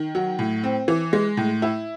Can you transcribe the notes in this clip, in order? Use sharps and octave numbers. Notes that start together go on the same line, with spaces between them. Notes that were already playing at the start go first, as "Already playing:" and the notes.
Already playing: D#3
F#3
A2
C4
E3
G#3
A2
E4